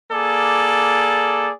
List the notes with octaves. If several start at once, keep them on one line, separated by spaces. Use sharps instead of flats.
A#3 G#4 A4 D5